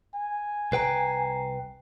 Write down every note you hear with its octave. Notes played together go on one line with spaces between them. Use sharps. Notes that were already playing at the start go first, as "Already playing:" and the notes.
G#5
C2 B4 G5 A#5 C7